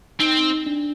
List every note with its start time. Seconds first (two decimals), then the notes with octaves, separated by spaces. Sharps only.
0.20 C4 D#4
0.66 D4